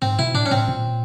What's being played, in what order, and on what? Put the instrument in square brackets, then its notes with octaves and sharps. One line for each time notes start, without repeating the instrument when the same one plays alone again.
[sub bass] G#2 [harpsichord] C4
[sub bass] B2 [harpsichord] E4
[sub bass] A2 [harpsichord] D4
[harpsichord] C#4
[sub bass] A2 [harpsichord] C4
[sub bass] A#2